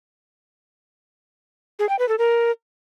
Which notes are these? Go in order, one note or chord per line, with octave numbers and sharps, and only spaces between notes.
G#4
G5
B4
A4
A#4